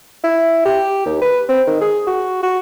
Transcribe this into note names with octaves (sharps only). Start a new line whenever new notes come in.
E4
G4
D#2
B4
C4
D#3
G#4
F#4
F#4